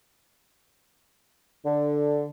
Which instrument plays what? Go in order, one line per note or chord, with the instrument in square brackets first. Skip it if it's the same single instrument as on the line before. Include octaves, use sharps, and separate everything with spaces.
[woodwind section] D3